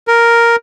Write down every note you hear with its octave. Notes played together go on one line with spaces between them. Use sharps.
A#4